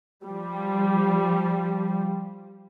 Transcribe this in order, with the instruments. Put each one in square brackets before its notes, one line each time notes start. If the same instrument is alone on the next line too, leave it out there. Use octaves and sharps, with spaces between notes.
[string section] F3 G3